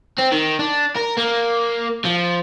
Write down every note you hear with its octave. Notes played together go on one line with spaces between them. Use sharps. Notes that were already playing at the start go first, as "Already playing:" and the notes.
C4
D#3
D4
A#4
A#3
F3